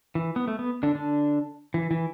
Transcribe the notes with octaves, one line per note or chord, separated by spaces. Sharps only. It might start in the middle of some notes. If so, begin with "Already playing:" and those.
E3
B3
A3
B3
D3 D4
D3 D4
E3
E3